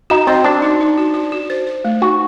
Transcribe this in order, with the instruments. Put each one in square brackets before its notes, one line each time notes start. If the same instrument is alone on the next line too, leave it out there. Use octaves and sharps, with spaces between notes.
[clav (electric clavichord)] D#4 [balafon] F#4
[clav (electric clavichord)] C4 [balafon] C5
[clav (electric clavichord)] D4 [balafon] F#4
[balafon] D#4
D#4
F#4
F#4
F#4
C5
C5
A3
[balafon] D#4 [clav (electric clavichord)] F#4